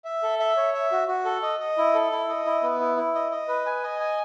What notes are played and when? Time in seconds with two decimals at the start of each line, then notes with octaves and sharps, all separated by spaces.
0.05 E5
0.23 A4
0.40 E5
0.57 C#5
0.74 E5
0.92 F#4
1.08 F#4
1.25 A4
1.42 D#5
1.60 D#5
1.78 E4
1.94 A4
2.12 E4
2.29 D#5
2.45 E4
2.63 B3
2.80 E4
2.97 E4
3.15 D#5
3.31 D#5
3.48 B4
3.66 G#5
3.83 D#5
4.00 G#5